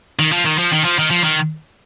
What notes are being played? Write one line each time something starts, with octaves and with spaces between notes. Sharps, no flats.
D#3
F3
D#3
F3
D#3
F3
D#3
F3
D#3